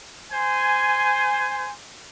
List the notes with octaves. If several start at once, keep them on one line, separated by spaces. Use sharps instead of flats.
C5 G#5